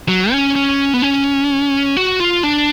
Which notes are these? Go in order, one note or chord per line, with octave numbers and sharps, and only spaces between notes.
F#3
C#4
C#4
B3
C#4
F#4
F4
D4